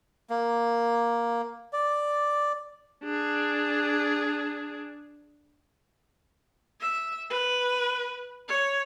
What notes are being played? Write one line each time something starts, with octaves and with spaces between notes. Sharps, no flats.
A#3
D5
D4 G#4
E5
B4
C#5